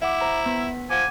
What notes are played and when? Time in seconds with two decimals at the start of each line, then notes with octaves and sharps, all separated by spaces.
0.02 E4 E5 F#5 D6
0.21 C5 A#5
0.46 B3 B6
0.90 F3 F#5 G#5 D6